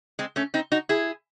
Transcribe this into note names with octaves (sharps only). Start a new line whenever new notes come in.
G#3 C4
A3 C#4
C4 D#4
D#4 F#4
E4 G#4